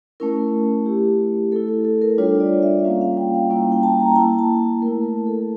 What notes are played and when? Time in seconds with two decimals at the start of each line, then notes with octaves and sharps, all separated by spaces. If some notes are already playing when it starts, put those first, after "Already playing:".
0.20 A3 C#4 E4 A#4
0.86 A3 E4 G4
1.52 A3 E4 A4
1.68 A4
1.85 A4
2.02 A#4
2.18 G3 D4 F4 C#5
2.40 D5
2.63 E5
2.84 G3 A#3 C#4 F4 F5
3.01 F5
3.17 G5
3.34 F5
3.50 G3 A#3 C#4 E4 G5
3.72 G5
3.83 A5
4.00 A#5
4.16 A#3 E4 A5
4.39 A5
4.82 A3 E4 A#4
5.04 A#4
5.27 A4